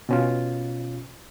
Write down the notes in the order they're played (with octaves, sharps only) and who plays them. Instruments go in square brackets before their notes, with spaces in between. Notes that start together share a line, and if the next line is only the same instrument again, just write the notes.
[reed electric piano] B2 C#4 F4